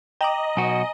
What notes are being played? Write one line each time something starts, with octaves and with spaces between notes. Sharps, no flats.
D#5 G5 A#5 D6 F#7
B1 F#4 G#5